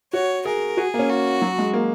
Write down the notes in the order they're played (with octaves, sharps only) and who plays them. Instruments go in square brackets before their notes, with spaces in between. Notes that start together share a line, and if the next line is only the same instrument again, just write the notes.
[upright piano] F#4 [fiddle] C#5
[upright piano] G#4 [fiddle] A#4
[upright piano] F#4 [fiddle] G#4
[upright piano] A#3
C#4
[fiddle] F#4
[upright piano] F#3
G#3
A#3